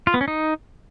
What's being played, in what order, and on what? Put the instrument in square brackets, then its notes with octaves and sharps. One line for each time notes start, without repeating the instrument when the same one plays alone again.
[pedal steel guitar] F4
B3
C#4
D#4